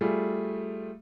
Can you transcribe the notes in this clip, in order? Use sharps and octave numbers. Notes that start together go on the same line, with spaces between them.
G3 A3 F4 G#4